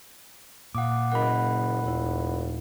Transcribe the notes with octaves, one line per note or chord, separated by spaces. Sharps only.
A#2 F5 F#5 D6 D#6
F#1 A#4 D#5 F#5 B5
F1 D#2 E4